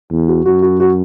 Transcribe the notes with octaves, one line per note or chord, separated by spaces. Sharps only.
E2
F#4
F#2 F#4
F#4
F#4